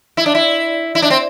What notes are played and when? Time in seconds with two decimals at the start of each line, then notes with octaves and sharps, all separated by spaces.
0.17 E4
0.26 D4
0.35 E4
0.95 E4
1.02 D4
1.10 C4